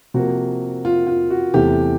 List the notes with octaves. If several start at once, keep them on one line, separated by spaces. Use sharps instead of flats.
C3 F3 A#3 F#4
F4
F4
F#4
E2 C3 E3 A3 G4